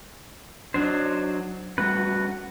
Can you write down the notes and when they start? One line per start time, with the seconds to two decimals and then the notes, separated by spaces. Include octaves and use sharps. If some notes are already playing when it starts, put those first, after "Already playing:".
0.74 F#3 D4 D#4 C5
1.78 G3 A3 C#4 F#4 B4